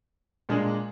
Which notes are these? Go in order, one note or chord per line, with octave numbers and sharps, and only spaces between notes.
A#2 G#3 D4 G#4